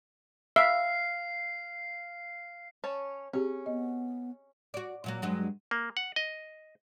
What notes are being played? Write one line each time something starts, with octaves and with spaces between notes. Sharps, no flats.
E5 F5 C7
C#4 C#5 A5
C4 C#4 G4 G#4
B3 D#5
F#4 D5
A#2 F#3 A#3
G2 F#3 G#3
A#3
F#5
D#5